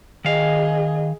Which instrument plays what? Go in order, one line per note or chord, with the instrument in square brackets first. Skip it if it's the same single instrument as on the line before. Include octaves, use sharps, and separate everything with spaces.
[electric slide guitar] D#3 F5 [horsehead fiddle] G#4 D#5